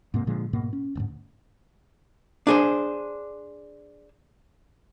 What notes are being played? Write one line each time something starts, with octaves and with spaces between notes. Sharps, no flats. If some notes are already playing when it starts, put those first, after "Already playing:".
G#2 C3 A#3
A#2 D3 F3 G#3
G#2 B2 A#3
C#4
D1 D2 G#2
D4 G#4 C5